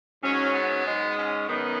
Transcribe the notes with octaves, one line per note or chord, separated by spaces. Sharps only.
G#2 F#3 C#4
B3
G#2 G#3
C#4
F#2 D#3 B3 D#4